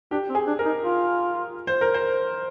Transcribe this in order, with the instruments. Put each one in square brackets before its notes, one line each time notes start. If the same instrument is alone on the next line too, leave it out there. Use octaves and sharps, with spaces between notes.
[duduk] D4 [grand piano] G4
[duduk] C4
[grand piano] G#4
[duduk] D4
[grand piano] A#4
[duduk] D#4
F4
[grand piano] C5
A#4
C5